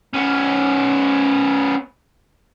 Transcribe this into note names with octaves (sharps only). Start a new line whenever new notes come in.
B3 C#4